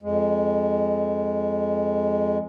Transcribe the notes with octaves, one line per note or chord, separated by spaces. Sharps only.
F2 G#3